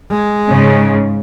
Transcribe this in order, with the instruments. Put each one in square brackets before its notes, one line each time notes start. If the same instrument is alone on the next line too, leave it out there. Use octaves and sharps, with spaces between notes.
[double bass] G#3
[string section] G#2 C#3